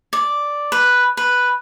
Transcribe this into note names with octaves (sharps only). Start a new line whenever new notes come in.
D5
B4
B4